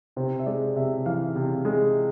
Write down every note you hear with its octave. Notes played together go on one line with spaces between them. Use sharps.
C3 C5
E5
G#3 D5
C3 E5
E3 F5
C3
G#3